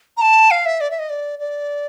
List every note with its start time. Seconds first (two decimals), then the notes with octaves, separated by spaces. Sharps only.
0.17 A#5
0.21 A5
0.51 F5
0.66 E5
0.81 D5
0.91 E5
0.99 D#5
1.10 D5
1.39 D5